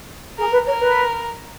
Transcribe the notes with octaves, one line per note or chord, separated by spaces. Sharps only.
G#4 A#4
B4
A#4 C#5
B4